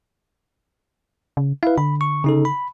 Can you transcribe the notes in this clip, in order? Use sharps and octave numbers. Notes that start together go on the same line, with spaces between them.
C#3
E4 B4 F5
D3 B5
C#6
C#3 D#4 A4
B5